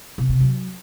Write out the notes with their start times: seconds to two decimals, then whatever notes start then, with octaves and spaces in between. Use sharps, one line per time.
0.18 B2
0.29 C3
0.40 F#3